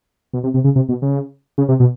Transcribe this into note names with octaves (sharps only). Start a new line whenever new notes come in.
B2
C3
C3
C#3
C3
B2
C#3
C#3
C3
B2